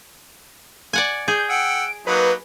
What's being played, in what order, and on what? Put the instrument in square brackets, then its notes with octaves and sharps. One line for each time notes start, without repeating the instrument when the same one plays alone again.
[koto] D5 F#5 G#5
[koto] G#4 [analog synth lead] G6
[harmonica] F#5 G5 E6 [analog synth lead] D7
[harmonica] F#3 A#3 D#4 [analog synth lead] B4